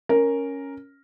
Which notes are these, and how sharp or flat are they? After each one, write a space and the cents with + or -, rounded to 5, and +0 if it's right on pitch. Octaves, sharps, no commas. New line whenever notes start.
C#4 +0 A#4 +0